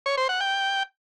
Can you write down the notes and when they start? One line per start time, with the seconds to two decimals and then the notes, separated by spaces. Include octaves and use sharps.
0.06 C#5
0.17 C5
0.29 F#5
0.41 G5